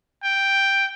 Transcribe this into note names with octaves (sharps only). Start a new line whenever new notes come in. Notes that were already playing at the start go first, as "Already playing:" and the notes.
G5